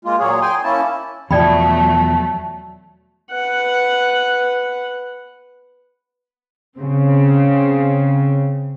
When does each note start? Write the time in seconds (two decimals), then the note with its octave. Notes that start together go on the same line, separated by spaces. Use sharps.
0.05 G#3 A#3 F4
0.20 A#2 F#3 A#3 G#4 C#5
0.42 G#4 G5 G#5 C6
0.64 A#3 C#4 E4 A5
1.31 E2 B2 F3 F#3 A3 D5 G5 B5
3.31 B4 F#5
6.78 C#3 C4